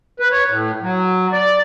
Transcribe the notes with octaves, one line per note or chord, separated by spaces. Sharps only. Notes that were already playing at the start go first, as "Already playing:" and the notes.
B4
C#5
A2
F#3
D5